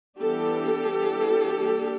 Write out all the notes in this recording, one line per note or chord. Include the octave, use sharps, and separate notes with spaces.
E3 G3 B3 D4 G4 A4
E3 G3 B3 D4
G3 A#3 D4